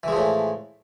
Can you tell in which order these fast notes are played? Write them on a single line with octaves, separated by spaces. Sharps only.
E3 G#3 F3 A2